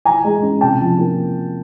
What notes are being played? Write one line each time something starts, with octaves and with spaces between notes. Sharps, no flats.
E3 G#5 A#5
G#3
C#4
C3 G5 A5
F3
A#3